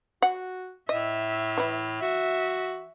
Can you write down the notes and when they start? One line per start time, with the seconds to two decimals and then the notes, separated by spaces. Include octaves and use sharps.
0.22 F#4 F#5
0.89 A2 D#5 E5
1.58 E3 E4
2.02 F#4 E5